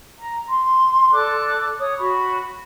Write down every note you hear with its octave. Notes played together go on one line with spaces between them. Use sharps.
A#5
C6
A4 D5 D6 F#6
C#5 D#6
F#4 B5 C#6